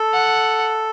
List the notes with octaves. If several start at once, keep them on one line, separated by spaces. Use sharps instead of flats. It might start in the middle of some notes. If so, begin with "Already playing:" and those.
Already playing: A4
F#5